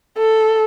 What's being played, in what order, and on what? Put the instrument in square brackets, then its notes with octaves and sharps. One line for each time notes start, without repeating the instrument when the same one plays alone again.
[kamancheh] A4